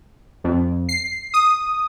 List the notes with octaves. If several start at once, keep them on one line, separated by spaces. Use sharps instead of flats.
F2
C7
D#6